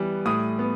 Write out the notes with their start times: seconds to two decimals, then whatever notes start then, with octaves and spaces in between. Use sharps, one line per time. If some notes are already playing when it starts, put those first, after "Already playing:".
Already playing: E3 G3 B3
0.26 A2 D#6
0.59 B3